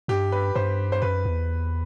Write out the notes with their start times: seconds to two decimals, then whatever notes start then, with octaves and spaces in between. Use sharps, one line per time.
0.08 G2 G4
0.32 B4
0.55 G2 C5
0.92 C5
1.02 F#2 B4
1.25 E2